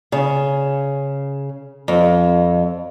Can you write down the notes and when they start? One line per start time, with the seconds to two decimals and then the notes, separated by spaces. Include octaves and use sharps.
0.12 C#3
1.88 F2